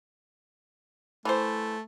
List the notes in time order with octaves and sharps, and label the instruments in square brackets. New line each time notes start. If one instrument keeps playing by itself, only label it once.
[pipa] E3 C5 [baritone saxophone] A3